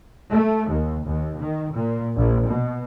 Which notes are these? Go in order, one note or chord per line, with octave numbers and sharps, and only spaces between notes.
A3
D#2
D#2
D#3
A#2
A#1
B2